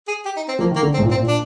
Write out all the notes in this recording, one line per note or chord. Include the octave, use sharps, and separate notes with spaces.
G#4
G4
D#4
C4
F3 A#3
D#3
A#3
D3
C4
G#2
A#2
C4
A#2
D4